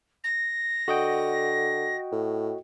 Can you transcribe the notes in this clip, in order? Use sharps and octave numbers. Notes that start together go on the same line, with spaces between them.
A#6
D3 F#4 D#5 G5
A2